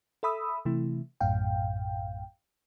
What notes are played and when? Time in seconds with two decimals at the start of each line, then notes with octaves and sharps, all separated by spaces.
0.23 A4 E5 B5 D#6 E6
0.65 C3 E3 A3 E4
1.21 A#1 F#2 A2 F5 G5